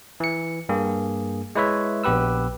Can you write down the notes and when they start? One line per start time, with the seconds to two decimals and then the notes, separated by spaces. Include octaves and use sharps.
0.20 E3 C#7
0.69 G2 A#3 G#4
1.55 G#3 E4 B4 C#5 E5
2.04 A#1 B3 G4 B4 E6